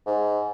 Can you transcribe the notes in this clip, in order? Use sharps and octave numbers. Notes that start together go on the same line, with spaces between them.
G#2